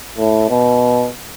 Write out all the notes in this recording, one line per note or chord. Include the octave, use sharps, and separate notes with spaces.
A2
B2